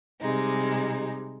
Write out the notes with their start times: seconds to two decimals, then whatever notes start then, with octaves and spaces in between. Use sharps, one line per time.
0.21 C3 G3 G#3 D#4